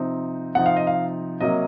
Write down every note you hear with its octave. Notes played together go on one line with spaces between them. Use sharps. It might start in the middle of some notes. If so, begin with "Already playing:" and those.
Already playing: C3 F3 C4 D#4
C3 F3 C4 D#4 F#5
F5
D#5
F5
C3 F#3 A#3 D#5